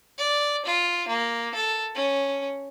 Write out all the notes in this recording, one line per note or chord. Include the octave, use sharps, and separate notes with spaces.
D5
F4
A#3
A4
C#4